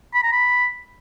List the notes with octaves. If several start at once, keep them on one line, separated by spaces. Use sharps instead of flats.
B5
A#5
B5